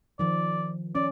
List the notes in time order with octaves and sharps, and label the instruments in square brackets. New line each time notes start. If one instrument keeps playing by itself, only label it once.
[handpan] D#3 F3 [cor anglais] D5
[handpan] C#4 [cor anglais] D5